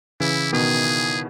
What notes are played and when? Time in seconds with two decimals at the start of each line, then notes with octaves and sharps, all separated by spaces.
0.20 C#3 E3 E4
0.53 B2 D#3 G#4